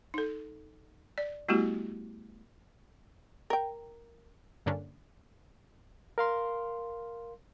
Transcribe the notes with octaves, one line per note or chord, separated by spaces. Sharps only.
D#4 A4
D5
G3 A3 B3 E4 F#4 G4
A#4 G5
G2 D3 A#3 C#4 D4
A#4 F5 C6